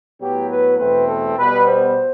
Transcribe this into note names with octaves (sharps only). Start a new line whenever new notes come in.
A2 F#3 B3 G4
B4
E2 B2 A3 C4 B4
A4
B2 G3 B3 B4
C5